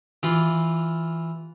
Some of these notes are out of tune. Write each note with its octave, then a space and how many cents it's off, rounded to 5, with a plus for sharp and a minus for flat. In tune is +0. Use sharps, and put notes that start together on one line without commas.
E3 -5 F4 +0 D6 +0